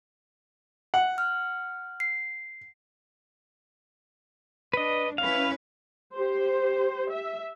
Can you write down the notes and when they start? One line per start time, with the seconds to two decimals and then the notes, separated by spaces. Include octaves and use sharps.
0.94 F#5
1.18 F6
2.00 C7
4.73 D4 B4 D#5
5.18 C#4 E4 B4 F5
6.15 G4 C5
7.11 E5